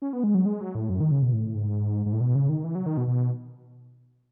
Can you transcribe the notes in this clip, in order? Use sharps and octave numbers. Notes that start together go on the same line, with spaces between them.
C#4
B3
G#3
F#3
G#3
F#3
A2
F#2
D#3
C#3
B2
A2
G#2
G#2
A2
B2
C#3
D#3
E3
F#3
D#3
B2
B2